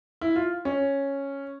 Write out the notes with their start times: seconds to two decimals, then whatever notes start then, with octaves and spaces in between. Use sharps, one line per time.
0.21 E4
0.36 F4
0.65 C#4